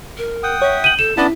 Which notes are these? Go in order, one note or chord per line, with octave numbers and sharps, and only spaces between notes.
A#4
F#5 G5 D#6
C#5 E5
G6 D#7 F#7
A4 E7
B3 C#4 D4 E4 A5